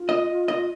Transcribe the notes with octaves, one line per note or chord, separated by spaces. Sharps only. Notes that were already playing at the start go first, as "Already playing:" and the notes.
Already playing: F4
D#5
D#5